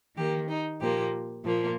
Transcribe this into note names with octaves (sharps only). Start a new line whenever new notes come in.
D#3 A#3 G4
D#4
A#2 F3 A#3 G4
A#2 F3 A#3